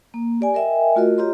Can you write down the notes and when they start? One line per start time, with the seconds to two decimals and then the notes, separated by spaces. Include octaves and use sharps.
0.14 A#3
0.41 G4 D5 G#5
0.54 A#4 D#5 E5 G5 G#5
0.96 A3 F4 F#4 A#4 D#5
1.18 F4 G4 C#5 D#5 A#5 C6